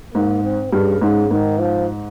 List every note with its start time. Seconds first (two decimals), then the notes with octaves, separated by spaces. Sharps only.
0.15 G#2 A#3
0.44 C4
0.72 G2 C#3
1.01 G#2 C#3
1.31 G#2 D#3
1.60 F3